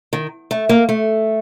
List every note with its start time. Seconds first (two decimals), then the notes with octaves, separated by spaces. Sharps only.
0.13 D#3
0.51 A3
0.69 A#3
0.89 A3